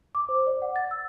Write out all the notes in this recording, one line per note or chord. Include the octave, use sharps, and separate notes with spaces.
D6
C5
D5
F#5
A6
E6